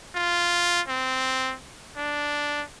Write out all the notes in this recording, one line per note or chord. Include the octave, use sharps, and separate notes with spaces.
F4
C4
D4